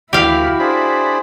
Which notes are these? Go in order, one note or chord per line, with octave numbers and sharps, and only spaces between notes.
D2 E3 E4 F#4 G4 F5 B5
D4 G#4 C5 B5